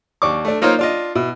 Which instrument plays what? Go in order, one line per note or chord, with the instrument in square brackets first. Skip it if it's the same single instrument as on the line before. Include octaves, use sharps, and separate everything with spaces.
[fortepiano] D#2 D4 C#6 D6
A3 D4
A#3 D#4 F4 A#4 C5 C#5
D4 F4 D#5
B2 E4